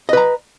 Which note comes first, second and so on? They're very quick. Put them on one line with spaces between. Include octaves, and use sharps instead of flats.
D#5 B4 A#5